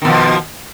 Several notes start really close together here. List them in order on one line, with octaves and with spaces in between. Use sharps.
D#3 B2 F3